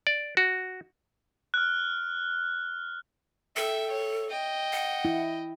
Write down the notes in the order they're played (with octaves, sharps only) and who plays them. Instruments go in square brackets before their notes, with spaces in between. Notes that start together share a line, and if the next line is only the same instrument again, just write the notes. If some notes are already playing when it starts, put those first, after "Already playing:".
[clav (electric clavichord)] D5
F#4
[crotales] F6 F#6
[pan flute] A4 [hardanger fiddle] E5 G5
[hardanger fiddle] C#5
D#5 G5
[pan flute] F#5
[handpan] E4